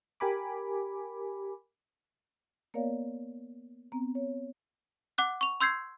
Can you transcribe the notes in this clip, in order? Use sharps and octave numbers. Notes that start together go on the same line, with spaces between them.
G4 A#4 G#5 B5 D6
A#3 B3 A#4 C#5 D5 F5
B3 C4 A#5
C#5
F#5 D6 F#6
C#6 F7
C6 E6 G6 G#6 C7